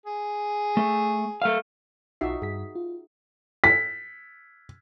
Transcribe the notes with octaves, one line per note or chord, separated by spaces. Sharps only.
G#4
A3
A3 F5
B1 D#4 F4 F#4 E5 C7
G2 G#4 B6
F4
B6